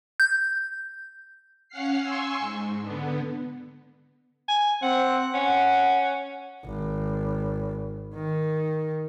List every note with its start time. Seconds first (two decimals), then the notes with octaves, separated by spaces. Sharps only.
0.20 G6
1.69 C#4 F5 F#5 F6 C7
2.01 G#5 C6 C#6 E6
2.40 G#2
2.80 D3 B3
4.48 G#5
4.83 C4 F#5
5.34 C#4 F#5
6.65 G#1
8.15 D#3